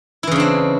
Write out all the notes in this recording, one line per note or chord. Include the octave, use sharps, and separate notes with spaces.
C#3 E3 C4 D4 E4